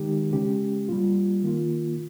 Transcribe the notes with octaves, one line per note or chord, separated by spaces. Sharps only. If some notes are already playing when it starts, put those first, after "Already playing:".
Already playing: D#3 G#3 D#4 G4
C#3 G#3 C#4 G4
G3 A#3 F4
D#3 A#3 F4